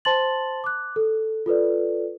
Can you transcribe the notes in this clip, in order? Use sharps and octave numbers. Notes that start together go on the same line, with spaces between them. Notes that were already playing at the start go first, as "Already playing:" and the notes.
C5 A5 C6 A6 F#7
D6 F#6
A4
F4 A4 B4 D5